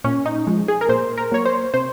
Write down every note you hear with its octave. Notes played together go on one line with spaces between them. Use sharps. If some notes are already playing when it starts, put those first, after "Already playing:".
A#2 C#4
D#4
F3 G#3
G#4
A#4
A#2 C5
A#4
F#3 A#3 C#5
C5
C3 C5